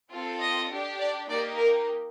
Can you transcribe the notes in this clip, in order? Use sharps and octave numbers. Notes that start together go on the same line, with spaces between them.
C4 F4 A4
D#5
D4 G4
D5
A#3 D#4 G4 D5
A#4